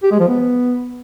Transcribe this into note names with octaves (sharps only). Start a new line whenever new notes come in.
G4
G#3
F3
B3